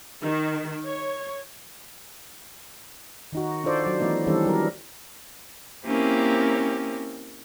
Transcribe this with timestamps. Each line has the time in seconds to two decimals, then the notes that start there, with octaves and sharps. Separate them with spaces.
0.22 D#3
0.85 C#5
3.33 D#3 D#4 F#4
3.64 D4 F4 A4 C5 D5
3.82 F#3 D5
4.00 E3 A3 B3 D#4
4.27 D#3 E3 G3 C4 D4 A4
4.46 F#3 G3 A#4
5.85 A#3 C4 C#4 E4 G4 A#4